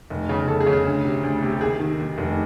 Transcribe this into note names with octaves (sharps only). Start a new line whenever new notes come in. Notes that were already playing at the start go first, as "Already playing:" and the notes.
F1
C#3
C#3 A4
G#4
C#3
G#4
D2
C3
D2
C3
G4
D#2 G#4
D#3
D#2
F1